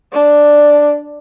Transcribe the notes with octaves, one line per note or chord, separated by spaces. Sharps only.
D4